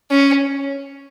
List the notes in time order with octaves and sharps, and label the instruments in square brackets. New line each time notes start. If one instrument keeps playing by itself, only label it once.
[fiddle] C#4